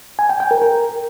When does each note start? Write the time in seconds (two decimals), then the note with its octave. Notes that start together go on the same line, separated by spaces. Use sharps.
0.19 G#5
0.29 G5
0.40 G5
0.51 A#4
0.62 A#4